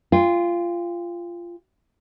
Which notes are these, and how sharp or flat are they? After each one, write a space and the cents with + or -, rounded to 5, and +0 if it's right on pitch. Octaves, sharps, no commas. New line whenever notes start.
F4 -15 G5 +35